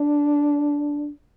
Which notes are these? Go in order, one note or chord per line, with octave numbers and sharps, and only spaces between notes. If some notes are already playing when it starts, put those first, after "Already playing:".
Already playing: D4